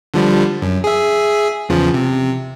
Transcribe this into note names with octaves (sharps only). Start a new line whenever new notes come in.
D3 F3 G3
F#2
G#4 E5
E2 C#3 F3
C3